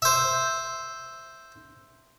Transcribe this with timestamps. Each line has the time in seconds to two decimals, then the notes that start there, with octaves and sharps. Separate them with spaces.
0.02 C5 E5